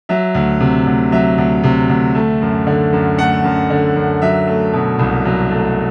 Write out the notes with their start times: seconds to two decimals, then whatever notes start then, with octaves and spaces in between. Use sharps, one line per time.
0.09 F#3 E5
0.34 D2
0.60 C3
0.87 D2
1.12 F#3 E5
1.38 D2
1.63 C3
1.89 D2
2.15 A3
2.42 F#2
2.67 D3
2.93 F#2
3.18 A3 F#5
3.44 F#2
3.70 D3
3.96 F#2
4.22 F#3 E5
4.47 A3
4.73 B2
4.99 C2
5.25 F#3
5.50 A3